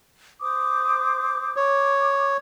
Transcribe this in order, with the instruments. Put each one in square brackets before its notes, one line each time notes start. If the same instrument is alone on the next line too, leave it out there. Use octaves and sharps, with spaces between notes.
[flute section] C5 D6 D#6
[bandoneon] C#5 [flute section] D6